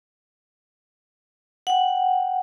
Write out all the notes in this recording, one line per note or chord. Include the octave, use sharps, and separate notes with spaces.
F#5 G5